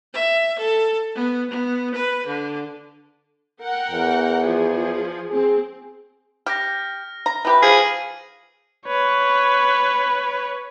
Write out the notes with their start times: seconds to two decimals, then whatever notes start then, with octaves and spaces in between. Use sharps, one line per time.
0.14 E5
0.59 A4
1.15 B3
1.50 B3
1.95 B4
2.26 D3
3.61 A#4 F#5 G5
3.91 E2
4.44 F3 G#4
5.31 C4 G#4
6.46 G4 F6 A#6
7.26 A#5
7.45 E3 G4 B4
7.62 F3 G#4 F6 D#7 F#7
8.87 B4 C#5